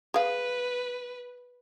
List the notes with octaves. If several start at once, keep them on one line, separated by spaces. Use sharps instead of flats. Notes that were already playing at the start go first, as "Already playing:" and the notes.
G#4 B4 F5